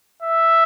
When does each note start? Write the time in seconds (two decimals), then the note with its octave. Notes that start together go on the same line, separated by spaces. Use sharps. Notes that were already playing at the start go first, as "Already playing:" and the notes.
0.22 E5